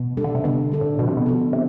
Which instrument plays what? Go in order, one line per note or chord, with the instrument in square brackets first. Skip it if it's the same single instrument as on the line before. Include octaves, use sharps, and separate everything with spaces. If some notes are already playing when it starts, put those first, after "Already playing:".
Already playing: [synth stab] B2
[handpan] G3 D4 A4
[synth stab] D3
C3
[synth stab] B2 [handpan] D3
[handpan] G3 D4 A4
[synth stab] A2
[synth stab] B2 [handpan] F3
[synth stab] C3
B2
[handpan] B3 F4 A4
[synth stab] C3